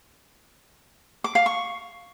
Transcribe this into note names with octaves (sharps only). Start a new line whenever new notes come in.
D6
F5
C#6